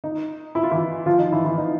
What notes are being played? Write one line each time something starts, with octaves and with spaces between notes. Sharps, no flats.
D#4
E4
F4
E3 E4
F3 F4
D#4
E3 E4
E3 E4
D#4